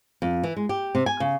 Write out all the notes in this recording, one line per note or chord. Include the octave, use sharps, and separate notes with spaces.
F2
E3
G#3
G4
C3
G#5
C#3